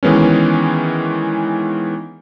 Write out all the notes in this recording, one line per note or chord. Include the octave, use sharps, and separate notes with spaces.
D#3 E3 G#3 B3 C#4